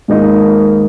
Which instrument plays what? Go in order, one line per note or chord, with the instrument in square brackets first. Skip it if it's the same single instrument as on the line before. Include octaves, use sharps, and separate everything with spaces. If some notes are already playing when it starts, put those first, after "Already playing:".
[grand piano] G#2 D#3 A#3 D#4